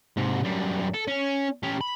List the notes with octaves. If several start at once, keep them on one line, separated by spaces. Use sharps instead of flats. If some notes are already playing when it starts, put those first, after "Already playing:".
G#2 C3
F#2 G3
A4
C#4
C#4 G4
B5